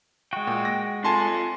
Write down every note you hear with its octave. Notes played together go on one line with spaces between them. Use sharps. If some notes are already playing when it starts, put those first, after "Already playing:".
G#3 F#4 G5
A#2
A#6
F4 A4 G#5 A5 C6